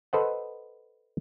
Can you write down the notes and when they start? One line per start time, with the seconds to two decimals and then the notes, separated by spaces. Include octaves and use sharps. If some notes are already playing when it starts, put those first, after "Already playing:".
0.13 A4 B4 C5 D#5 F#5